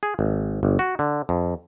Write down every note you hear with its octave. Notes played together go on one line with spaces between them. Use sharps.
G#4
G#1
G1
F#4
D3
F2